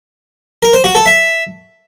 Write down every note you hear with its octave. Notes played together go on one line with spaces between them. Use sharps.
A#4
C5
F#4
A4
E5